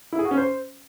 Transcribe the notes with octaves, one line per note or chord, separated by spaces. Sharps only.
E4
G#4
F#4
C#4
C5